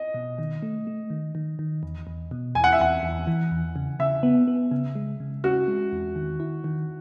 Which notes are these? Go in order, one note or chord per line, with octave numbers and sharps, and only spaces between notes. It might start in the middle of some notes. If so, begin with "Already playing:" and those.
Already playing: D#5
B2
D#3
A3
A3
D#3
D#3
D#3
E2
E2
B2
E2 G#5
F#5
E5
E2 F#5
E2
E3
E2
C#3
C#3 E5
B3
B3
C#3
G#3
C#3
C#4 F#4
G#3
E2
D#3
E4
D#3